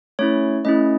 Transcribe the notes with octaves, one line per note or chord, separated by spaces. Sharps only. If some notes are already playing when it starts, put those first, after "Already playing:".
A3 C#4 E4 C#5
A3 C#4 E4 D#5